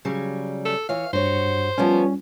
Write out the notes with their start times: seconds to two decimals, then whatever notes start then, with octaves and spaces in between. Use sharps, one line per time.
0.05 C#3 F#3 G3
0.65 A4
0.89 E3 C#5 F5
1.13 G2 F#4 C5 C#5
1.78 F3 G3 B3 C#4 C#5